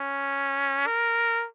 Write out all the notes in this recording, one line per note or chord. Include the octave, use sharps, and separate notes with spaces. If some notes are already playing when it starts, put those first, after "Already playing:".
Already playing: C#4
A#4